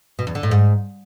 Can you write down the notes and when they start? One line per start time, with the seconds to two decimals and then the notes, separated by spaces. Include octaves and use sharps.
0.19 B2
0.27 E2
0.35 D3
0.43 A2
0.51 G#2